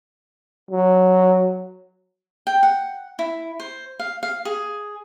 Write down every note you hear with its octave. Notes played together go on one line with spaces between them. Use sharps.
F#3
G5
F#5
E4
C5
F5
F5
G#4